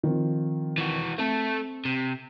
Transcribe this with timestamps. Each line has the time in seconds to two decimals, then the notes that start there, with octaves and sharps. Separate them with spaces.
0.03 D#3 F3 C4
0.78 E3 F#4
1.18 A3 C4 A4
1.85 C3